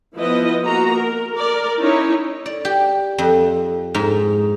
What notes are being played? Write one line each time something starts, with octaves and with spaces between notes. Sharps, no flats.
F3 B3 E4 B4 D#5
A#3 F#4 A#5
A#4
A#4 D5
C#4 D#4 E4 C#5
D5
G4
F2
G#2